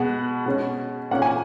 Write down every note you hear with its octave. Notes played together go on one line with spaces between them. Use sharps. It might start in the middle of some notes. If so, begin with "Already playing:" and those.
Already playing: B2 G#3 B3 F#5
B2 G#3 C#4
A#2 A#3 C#4 F#5
G#5